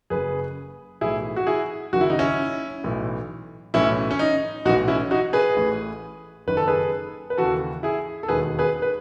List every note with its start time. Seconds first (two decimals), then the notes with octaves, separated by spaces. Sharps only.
0.10 F#1 F#2 C#3 G#4 B4
1.01 B1 A2 E3 E4 G#4
1.36 F#4
1.47 E4 G#4
1.93 F#1 F#2 D#3 F#4
2.01 E4
2.10 D#4
2.19 C#4 E4
2.84 B1 A2 E3
3.74 B1 A2 E3 C#4 E4
4.11 C#4
4.19 D#4
4.65 B1 A2 E3 D#4 F#4
4.88 C#4 E4
5.11 D#4 F#4
5.33 G#4 B4
5.56 A1 A2 E3
6.47 F#1 F#2 D#3 B4
6.57 A4
6.68 G#4 B4
7.30 B4
7.37 D#2 C#3 E3 F#4 A4
7.83 E4 G#4
8.23 A4
8.28 E1 D#2 D#3 G#4 B4
8.59 G#4 B4
8.82 B4